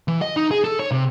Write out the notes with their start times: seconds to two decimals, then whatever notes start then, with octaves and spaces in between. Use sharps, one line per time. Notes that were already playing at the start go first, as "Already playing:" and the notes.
0.08 E3
0.22 D#5
0.37 D#4
0.51 G#4
0.64 A4
0.80 C#5
0.91 C3